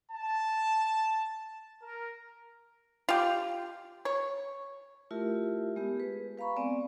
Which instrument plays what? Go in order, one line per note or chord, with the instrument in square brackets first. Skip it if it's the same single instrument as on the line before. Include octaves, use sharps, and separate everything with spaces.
[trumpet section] A5
A#4
[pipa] F4 G4
C#5
[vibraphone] A3 E4 F4 G4 A#4 E5
G#3 B3 G4 A#4
G#4 B4
B4 F5 A#5 B5 C#6
G#3 B3 C4 D5 G#5